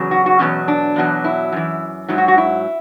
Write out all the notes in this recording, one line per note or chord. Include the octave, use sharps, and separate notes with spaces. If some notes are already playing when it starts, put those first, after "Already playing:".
Already playing: E2 C#3 F#3
F#4
F#4
E2 B2 F#3 C#4
D4
E2 B2 F#3
E4
F#2 E3
G#2 F#3 E4
F#4
F#4
E4